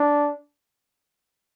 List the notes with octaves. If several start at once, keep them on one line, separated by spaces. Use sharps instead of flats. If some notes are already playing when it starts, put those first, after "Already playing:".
Already playing: D4